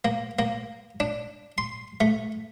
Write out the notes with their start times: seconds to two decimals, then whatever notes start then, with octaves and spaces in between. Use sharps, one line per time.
0.05 A#3
0.39 A#3
1.00 D4
1.58 C6
2.01 A3